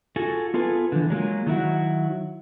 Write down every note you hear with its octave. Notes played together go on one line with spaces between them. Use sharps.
F4 F#4 G#4 A4
B3 F4 G#4 A4 B4
D3 E3
F#3 G#3 A#3 F4
D#3 F#3 E4 F#4